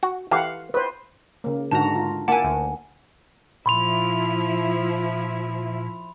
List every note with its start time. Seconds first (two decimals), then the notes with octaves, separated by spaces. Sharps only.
0.03 F#4
0.31 E3 G4 A4 F5 F#5
0.74 B4 C5
1.44 C#3 A#3
1.71 G#2 D3 D#4 F#4 A5 A#5
1.96 F4
2.28 A#3 E4 F#5 G#5 A5 D6
2.44 D2
3.66 A#2 F3 E4 B5 C6 F7